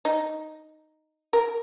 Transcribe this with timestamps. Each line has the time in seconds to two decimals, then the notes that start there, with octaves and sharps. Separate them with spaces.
0.05 D#4
1.33 A#4